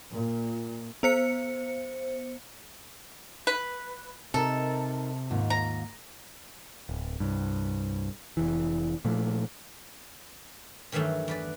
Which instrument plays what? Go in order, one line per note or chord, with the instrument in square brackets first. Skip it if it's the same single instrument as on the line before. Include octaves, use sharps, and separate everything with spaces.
[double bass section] A#2
[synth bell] B3 C5 C#7
[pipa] B4
[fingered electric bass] C3 [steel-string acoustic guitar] D#4 A#4 [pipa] A4
[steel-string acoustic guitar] D#2 G#2 F4
[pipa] A#5
[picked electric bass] D1
C2 G2
F1 E3
A#2 F3 A3
[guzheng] G2 D#3 E3 F#3 A3
E2 B4 D5